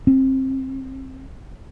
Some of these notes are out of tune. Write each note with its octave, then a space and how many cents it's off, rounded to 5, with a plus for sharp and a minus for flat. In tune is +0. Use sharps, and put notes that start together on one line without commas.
C4 +25